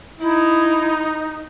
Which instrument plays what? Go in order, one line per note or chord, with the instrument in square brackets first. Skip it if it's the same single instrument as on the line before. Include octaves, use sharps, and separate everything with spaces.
[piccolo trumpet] D#4 [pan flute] E4